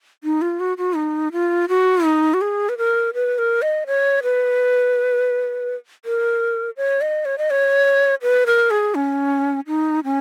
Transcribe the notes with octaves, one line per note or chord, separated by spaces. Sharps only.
D#4
F4
F#4
F#4
D#4
F4
F#4
D#4
F#4
G#4
B4
A#4
B4
A#4
D#5
C#5
B4
A#4
C#5
D#5
C#5
D#5
C#5
B4
A#4
G#4
C#4
D#4
C#4